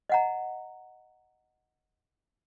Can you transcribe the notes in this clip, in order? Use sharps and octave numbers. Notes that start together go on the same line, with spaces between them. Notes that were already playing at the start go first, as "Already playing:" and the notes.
D#5 F#5 A#5